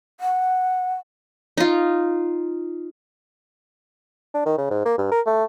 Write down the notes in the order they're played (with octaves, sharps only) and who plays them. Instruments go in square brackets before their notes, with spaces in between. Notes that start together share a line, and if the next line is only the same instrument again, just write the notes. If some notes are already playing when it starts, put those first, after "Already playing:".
[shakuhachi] F#5
[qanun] D#4 F4
[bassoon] D4
D#3
C#3
G#2
A#3
G2
A#4
A3